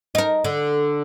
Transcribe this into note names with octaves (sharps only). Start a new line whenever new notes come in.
D#4 A#4
D3